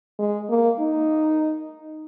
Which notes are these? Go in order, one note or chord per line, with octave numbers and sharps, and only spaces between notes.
G#3
A#3
D#4